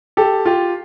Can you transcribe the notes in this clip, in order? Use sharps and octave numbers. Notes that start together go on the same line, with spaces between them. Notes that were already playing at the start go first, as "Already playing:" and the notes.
G4 A4
F4 G4